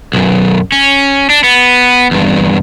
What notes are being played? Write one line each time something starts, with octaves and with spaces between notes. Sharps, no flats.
B1 F#2
C#4
D4
B3
E2 G2